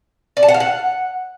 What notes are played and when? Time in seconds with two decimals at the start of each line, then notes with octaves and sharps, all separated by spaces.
0.37 D5
0.43 A5
0.48 F#5
0.54 F5
0.60 F#5